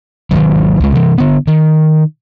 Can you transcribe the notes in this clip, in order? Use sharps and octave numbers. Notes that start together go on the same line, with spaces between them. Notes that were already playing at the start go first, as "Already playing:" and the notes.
G#1 C#2 D#3 F#3
C#2 G#3
C3 E3
D3 B3
D#3